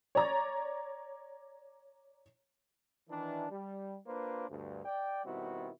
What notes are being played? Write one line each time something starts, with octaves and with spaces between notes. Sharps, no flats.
C#5 D5 A#5 A6
D#3 E3 D4
G3
A#3 D4 F4 B4 C5
D2 G2
D5 G5
B2 D#3 G3 C4 E4 F#4